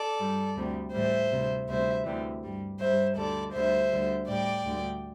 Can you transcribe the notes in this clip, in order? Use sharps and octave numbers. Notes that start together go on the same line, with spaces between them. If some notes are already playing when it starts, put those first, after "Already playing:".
Already playing: A4 D5
G2 G3
D2 C3 G3
A2 E3 G3 C5 E5
D2 C3 G3
D2 C3 G3 C5 E5
D2 C3 E3 G3
G2 G3
G2 G3 C5 E5
D2 D3 G3 A4 D5
D2 D3 G3 C5 E5
D2 D3 G3
A2 G3 D5 G5
D2 D3 G3